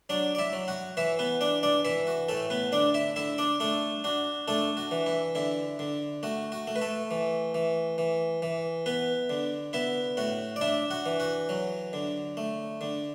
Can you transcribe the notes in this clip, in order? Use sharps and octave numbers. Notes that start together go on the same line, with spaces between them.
F#3 D4 D5
D5
E4 E5
F#3
F#4 F#5
E3 E4 E5
B3 B4
D4 D5
D4 D5
E3 E4 E5
F#4
A2 A3 A4
B3 B4
D3 D4 D5
E4 E5
D3 E4 E5
D4 D5
A3 D4 A4
D4 F#4
A3 D4 A4
F#4
E3
E4
D3 E4
D3
A3 F#4
F#4
A3
B4
A3 A4
E3
E3
E3
E3
B3 B4
D3
B3 E4 E5
A2 F#4 F#5
D5
D4 E4 E5
F#4 F#5
E3
F#4 F#5
F#3
D3
A3
D3